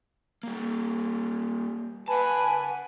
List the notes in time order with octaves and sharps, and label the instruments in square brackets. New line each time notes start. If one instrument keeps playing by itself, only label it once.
[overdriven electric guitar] G3 A#3
[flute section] B4 G#5 B5 [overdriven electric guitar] F#5 A5